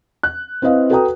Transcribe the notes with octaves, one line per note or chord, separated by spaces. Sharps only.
F#6
C4 E4 B4 D#5 F5
F#4 A4 B4 G5 A#5 D#6